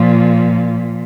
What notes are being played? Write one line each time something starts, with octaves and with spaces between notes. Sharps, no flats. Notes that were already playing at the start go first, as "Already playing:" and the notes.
Already playing: A#2 F3